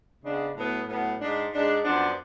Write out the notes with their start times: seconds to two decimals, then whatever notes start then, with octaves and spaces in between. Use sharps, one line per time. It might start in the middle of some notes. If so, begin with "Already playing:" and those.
0.23 C#3 G#3 B3 D4
0.54 A2 F#3 B3
0.87 A2 F#3 B3
1.19 G#2 G#3 D4
1.52 G#2 G#3 D4
1.83 F#2 F3 B3 D4